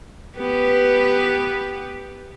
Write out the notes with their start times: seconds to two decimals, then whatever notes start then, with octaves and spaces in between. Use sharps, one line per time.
0.37 B3 G4 B4